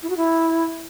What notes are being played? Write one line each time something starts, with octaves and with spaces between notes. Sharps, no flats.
E4
F#4
E4